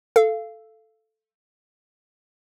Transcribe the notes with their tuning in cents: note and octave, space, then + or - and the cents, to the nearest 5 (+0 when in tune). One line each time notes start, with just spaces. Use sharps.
A4 +0 F5 -20